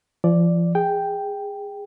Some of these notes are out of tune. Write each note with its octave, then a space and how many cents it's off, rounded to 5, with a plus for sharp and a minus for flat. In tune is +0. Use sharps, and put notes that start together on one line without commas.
F3 -35 D5 +0
G#4 -20 G5 +0